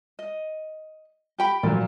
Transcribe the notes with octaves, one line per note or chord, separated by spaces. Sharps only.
D#5
G4 G5 B5
A#2 F3 F#3 D5